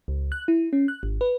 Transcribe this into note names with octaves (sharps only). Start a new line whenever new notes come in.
C#2
F#6
E4
C#4
F#6
G#1
B4